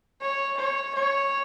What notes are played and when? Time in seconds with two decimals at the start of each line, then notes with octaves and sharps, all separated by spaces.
0.21 C#5
0.58 C#5
0.95 C#5